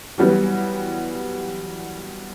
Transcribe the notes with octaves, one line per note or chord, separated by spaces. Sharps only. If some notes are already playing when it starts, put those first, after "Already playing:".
E3 F#3 G3 B3